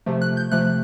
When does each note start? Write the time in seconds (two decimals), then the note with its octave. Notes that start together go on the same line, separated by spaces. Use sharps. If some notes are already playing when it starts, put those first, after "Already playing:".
0.06 C3 F3 A3
0.22 F#6
0.37 G6
0.51 C3 F3 A3 F#6